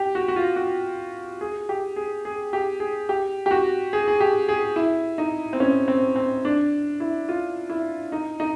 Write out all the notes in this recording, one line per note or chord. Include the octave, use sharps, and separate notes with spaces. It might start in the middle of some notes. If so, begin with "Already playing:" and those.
Already playing: G4
F#4
F#4
F4
F#4
G#4
G4
G#4
G#4
G4
G#4
G4
G4
F#4
G#4
G#4
G4
G#4
E4
D#4
C4
C#4
C4
C4
D4
E4
F4
E4
D#4
D#4